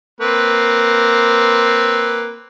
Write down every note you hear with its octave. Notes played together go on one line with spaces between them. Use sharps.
A#3 C4 B4